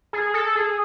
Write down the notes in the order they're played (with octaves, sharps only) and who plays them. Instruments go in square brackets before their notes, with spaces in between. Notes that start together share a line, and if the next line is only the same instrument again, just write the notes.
[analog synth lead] G#4
A4
G#4